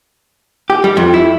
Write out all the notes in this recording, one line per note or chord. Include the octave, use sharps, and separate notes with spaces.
G4
G3
F2
E4